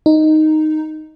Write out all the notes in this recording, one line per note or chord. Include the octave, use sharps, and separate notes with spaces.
D#4